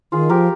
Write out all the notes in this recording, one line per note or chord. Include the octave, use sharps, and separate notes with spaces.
D#3 F4 G#4
F3 G4 A#4